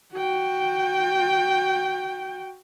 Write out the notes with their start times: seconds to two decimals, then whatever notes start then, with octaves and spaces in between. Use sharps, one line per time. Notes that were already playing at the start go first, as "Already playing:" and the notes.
0.14 F#4 G5